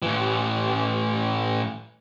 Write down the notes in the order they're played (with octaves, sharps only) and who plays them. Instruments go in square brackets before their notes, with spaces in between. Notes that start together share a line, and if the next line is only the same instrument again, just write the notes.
[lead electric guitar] A2 E3